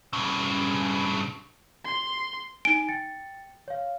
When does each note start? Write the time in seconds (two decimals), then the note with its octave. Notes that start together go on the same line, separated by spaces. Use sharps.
0.13 G2 C#3
1.85 C6
2.65 D#4 G#5 D7
2.89 G5 A6 C#7
3.68 C#5 F5